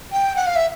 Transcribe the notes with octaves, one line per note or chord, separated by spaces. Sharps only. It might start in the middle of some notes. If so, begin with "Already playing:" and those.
G5
F#5
F5
E5